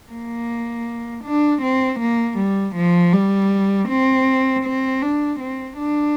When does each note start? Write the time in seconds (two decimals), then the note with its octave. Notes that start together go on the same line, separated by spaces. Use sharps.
0.12 A#3
1.24 D4
1.62 C4
2.00 A#3
2.38 G3
2.76 F3
3.13 G3
3.88 C4
4.64 C4
5.02 D4
5.40 C4
5.78 D4